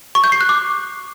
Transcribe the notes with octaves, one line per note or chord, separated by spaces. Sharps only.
C#6
G6
C7
F#6
D6